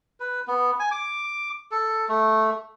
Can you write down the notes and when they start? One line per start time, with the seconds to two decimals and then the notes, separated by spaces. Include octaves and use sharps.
0.20 B4
0.48 B3
0.80 G#5
0.91 D6
1.71 A4
2.09 A3